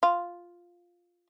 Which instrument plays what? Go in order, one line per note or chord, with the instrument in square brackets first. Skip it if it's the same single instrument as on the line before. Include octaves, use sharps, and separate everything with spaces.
[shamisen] F4